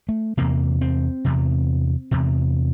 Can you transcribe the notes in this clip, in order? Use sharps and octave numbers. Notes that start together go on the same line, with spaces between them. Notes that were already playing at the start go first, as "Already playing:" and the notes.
A3
E2 C3 A#3
C4
E2 C3
E2 C3